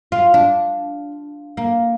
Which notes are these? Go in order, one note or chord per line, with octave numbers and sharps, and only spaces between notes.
F4
D4
A#3